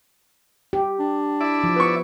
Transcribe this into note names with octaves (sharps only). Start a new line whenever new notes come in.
G4
D4
E4 D5
F3
B3 C#6